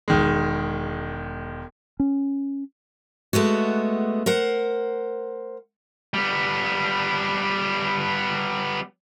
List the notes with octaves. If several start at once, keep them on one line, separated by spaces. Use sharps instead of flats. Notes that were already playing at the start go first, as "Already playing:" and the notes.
E1 D#3 G#3
C#4
G#3 A3 B3 F#4
A#4 C5 F#5
G3 B3